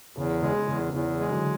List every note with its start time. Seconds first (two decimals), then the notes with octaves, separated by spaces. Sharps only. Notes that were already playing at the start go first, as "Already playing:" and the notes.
0.17 E2 C#3
0.42 C#3 G#3
0.68 E2 C#3
0.93 E2 C#3 E3
1.19 G#3
1.31 D3 F#3